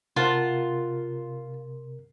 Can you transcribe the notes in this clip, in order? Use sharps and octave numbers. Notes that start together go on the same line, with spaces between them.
C3 F4 A#4 C5 F#5 A5